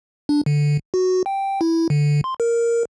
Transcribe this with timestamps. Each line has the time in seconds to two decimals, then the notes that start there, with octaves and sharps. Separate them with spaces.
0.29 D4
0.46 D3
0.94 F#4
1.26 G5
1.61 E4
1.90 D3
2.24 C6
2.40 A#4